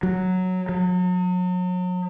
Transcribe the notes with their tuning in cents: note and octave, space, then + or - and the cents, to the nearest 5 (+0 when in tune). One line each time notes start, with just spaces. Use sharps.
F#3 -5
F#3 -35